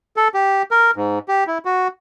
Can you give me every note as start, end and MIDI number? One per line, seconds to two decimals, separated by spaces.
0.16 0.28 69
0.34 0.63 67
0.71 0.91 70
0.96 1.19 44
1.28 1.44 67
1.47 1.58 64
1.65 1.88 66